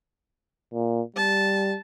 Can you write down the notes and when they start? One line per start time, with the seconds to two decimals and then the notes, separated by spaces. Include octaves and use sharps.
0.74 A#2
1.16 G3 A5